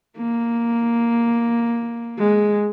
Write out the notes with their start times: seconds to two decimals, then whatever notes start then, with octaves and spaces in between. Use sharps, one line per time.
0.17 A#3
2.18 G#3